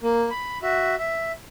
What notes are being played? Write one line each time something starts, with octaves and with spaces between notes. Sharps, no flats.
A#3
B5
F#4 E5
E5